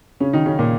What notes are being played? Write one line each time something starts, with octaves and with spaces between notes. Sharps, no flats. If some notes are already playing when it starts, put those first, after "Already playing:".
C#3 C#4
D#3 D#4
C#3 C#4
A#2 A#3